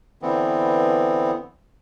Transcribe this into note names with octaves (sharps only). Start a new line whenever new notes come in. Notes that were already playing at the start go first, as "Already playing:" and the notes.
D3 E3 B3 C4